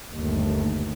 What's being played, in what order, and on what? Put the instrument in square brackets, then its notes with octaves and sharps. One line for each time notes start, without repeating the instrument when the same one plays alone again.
[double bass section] G1 D#2 A3